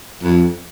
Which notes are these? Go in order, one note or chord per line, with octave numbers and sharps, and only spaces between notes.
F2